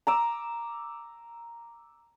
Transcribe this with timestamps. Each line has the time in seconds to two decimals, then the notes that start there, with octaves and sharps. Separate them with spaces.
0.07 A#5 D6 E6